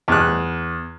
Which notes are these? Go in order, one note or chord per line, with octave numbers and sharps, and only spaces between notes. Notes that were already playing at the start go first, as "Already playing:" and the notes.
E2 F#6